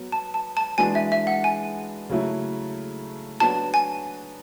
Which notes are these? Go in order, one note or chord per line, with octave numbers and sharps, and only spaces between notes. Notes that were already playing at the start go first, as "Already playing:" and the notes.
Already playing: F#3 B3
A5
A5
A5
E3 G#3 B3 D4 F#4 G#5
E5
E5
F#5
G#5
C#3 F#3 A3 E4
F#3 B3 D4 F#4 A5
G#5